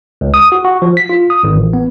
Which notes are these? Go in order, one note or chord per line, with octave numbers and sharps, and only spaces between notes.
C#2
D#6
F#4
F#4
F3
B6
F4
D#6
G#1
A1
B3